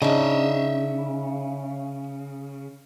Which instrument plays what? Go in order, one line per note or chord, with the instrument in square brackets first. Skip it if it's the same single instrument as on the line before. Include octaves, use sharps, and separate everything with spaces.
[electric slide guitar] C#3 [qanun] D4 D#4 [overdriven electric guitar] D#5 E5